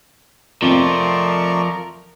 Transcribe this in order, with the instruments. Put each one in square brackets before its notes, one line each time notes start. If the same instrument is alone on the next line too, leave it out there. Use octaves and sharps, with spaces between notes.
[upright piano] F2 C3 [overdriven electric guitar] F3 [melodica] A3 D5 C#6 [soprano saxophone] A#4